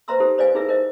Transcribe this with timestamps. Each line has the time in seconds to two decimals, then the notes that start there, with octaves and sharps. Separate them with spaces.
0.08 B4 C5 E5 A#5 C6 E6
0.20 D#4 G4 A4 C5
0.38 B4 C5 D5 D#5 F5 G#5
0.55 D#4 E4 G#4 A#4 B4 E5
0.68 D#4 A#4 C5 D#5